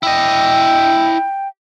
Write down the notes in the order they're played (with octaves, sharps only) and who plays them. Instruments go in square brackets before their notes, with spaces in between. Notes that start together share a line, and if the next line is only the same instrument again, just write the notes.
[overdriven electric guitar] E4 D#5 [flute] G5